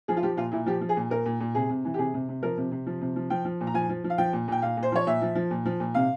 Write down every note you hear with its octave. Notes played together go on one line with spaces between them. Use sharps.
F3 G#4
F4
F3 G4
A#2 F4
A#2 E4
F3 G4
F3
G#4
A#2
A#2 A#4
A#2
A#2
C3 G#4
C3
E3
G4
C3 G#4
C3
C3
F3 A#4
C3
C3
F3
C3
F3
F3 G5
F3
A#2
A#5
F3 G#5
F3
F3
F5
F3 G5
A#2
A#2 G5
A#2 F5
A#2
C5
F3 C#5
A#2 E5
F3
F3
A#2
F3
A#2
C3 F5